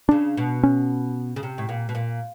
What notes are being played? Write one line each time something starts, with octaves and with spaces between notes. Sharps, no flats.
C#3 D4
B2
C#4
C#3
C3
A2
A#2
B2
A#2